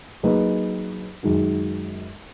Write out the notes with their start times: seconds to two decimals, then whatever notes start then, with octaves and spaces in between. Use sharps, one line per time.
0.23 F#3 A#3 D#4 G#4 B4
1.23 F#2 D#3 G#3 D#4 F#4